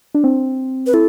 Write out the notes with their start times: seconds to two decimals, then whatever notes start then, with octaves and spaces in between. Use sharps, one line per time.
0.14 D4
0.24 C4
0.86 B4
0.94 E4 A4